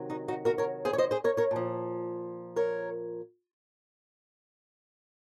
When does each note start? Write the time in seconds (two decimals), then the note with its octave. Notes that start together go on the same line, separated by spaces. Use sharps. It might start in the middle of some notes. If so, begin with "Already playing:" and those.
Already playing: C3 D#3 F#3
0.10 D#4 F#4
0.28 D#4 F#4
0.45 F#4 A#4
0.58 A#4 C#5
0.85 G#4 C5
0.93 C#5
0.98 C5 D#5
1.11 G#4 C5
1.24 A#4 C#5
1.37 A#4 C#5
1.51 A#2 F3
2.56 A#4 C#5